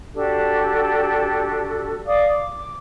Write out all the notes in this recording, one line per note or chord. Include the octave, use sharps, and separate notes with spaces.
D4 F#4 G4 A4
D5 F5 D6 D#6
D6